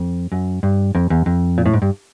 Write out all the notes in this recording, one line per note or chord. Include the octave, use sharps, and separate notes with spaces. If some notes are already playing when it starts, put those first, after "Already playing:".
Already playing: F2
F#2
G2
F2
E2
F2
A#2
A2
G#2
G2